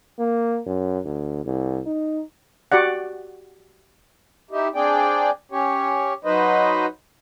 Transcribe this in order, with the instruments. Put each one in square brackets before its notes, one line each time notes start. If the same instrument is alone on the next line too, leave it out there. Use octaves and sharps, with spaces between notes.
[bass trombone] A#3
F#2
D2
C2
D#4
[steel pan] F#4 G4 D5 F#5
[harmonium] D#4 E4 G4
C4 D4 G#4 D5 G5
C#4 G4 C#5
F#3 D#4 B4 C5 D#5